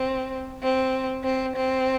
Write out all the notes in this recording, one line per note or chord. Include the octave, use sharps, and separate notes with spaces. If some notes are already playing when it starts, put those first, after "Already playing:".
Already playing: C4
C4
C4
C4